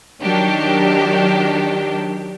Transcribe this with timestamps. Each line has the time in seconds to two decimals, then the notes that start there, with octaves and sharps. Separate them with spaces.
0.22 D#3 F#3 D4 G4